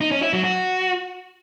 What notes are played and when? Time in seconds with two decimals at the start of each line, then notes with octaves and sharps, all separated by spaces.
0.01 D#4
0.11 C#4
0.22 E4
0.33 F#3
0.44 F#4